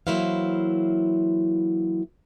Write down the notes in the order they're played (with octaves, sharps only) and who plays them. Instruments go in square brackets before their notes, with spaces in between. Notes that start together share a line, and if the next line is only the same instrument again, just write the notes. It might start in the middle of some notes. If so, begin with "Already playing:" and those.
[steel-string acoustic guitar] E3 F#3 A#3 E4 C5 F5